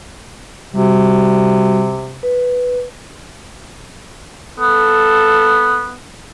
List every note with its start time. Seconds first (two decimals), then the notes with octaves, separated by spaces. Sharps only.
0.73 C3 G3 F#4
2.23 B4
4.59 B3 A4